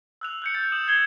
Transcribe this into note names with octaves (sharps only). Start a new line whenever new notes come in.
E6 F#6 F7
F#6 G6 C#7
E6 G6 A6
D#6 E7 F#7
E6 G#6 C7 F7 G7